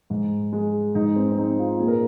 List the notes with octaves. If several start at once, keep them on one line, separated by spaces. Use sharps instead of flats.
G#2
G#3
G#2 D#4
C4
C4
G#3 D#4
F4
A#2 G#4
A#4